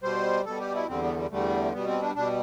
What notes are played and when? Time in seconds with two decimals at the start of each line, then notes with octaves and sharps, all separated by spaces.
0.02 B2 G3 C5
0.45 B2 G3 A4
0.60 G4
0.74 E4
0.88 E2 D3 G3 C4
1.02 B3
1.16 G3
1.30 E2 D3 G3 A3
1.73 B2 G3 B3
1.88 C4
2.02 D4
2.15 B2 G3 D4